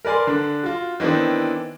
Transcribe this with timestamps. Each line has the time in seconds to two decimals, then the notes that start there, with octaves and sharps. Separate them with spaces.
0.05 A#4 B4 D5 G#5 C6
0.27 D3 D4
0.63 F4 F#4
1.00 D#3 E3 B3 C4 D4